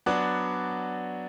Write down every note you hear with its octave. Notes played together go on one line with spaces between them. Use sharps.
F#3 B3 D4 F#4 D5